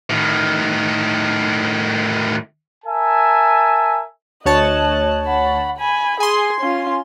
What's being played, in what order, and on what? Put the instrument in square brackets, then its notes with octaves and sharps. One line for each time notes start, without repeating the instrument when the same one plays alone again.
[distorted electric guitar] A2 D#3
[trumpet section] A#4 E5 G#5 A5
[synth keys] D2 C#5 A5 [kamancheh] D#5 F#6
[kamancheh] F#5 B5
G#5 B5
[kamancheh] G#4 [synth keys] G#5 C6
[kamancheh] C#4 F4